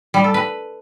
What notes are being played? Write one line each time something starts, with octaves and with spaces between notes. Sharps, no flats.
G3
A4
B4